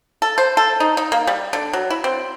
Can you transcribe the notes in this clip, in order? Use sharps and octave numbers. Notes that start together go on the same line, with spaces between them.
A4
C5
A4
D#4
D#4
A#3
G3
D3
F#3
E4
C4